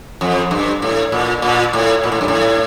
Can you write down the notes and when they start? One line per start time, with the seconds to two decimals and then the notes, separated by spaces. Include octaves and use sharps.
0.21 F2
0.51 G2
0.82 A2
1.12 A#2
1.42 A#2
1.73 A2
2.03 A#2
2.12 A2
2.21 G2
2.28 A2